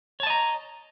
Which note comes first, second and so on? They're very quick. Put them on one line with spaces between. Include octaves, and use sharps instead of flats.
C#5 A5 D#5 A#5